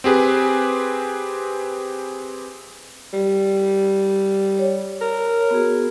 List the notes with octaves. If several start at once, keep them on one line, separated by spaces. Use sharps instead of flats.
C4 G4 G#4 B4
G3
C#5
A#4
B3 F#4 G#4